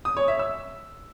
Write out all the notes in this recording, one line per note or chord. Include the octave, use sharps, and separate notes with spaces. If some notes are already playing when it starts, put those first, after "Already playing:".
D#6
C#5
E5
E6